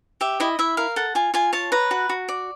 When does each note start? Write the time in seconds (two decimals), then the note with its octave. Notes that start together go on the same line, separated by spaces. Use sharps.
0.21 G4 E5
0.40 E4 D#5
0.59 E4 E5
0.77 A#4 F5
0.96 A4 F#5
1.15 F4 G#5
1.34 F4 G#5
1.53 C#5 A5
1.72 B4 A#5
1.91 F#4
2.09 F#4
2.29 D5